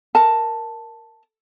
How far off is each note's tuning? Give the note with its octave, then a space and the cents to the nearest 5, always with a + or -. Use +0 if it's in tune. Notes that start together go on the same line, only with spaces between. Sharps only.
A#4 +0 A5 +0